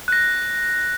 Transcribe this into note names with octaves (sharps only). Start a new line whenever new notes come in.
F#6 A#6